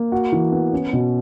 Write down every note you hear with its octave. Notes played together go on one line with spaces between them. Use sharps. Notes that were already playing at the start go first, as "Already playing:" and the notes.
Already playing: A#3
F#4
E3
B3
C#4
B2